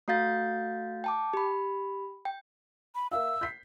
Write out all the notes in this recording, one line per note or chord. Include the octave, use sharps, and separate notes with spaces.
A3 F#4 F5 G6 A6
G5 A5 D6
G4 B5
G5
B5
A#4 E5 F5 E6
G6 B6 C7